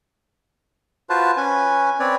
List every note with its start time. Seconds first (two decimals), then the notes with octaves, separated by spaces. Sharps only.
1.10 F4 F#4 B4 C5 A5
1.37 C#4 B4 G#5
1.99 C4 B4 C#5 D5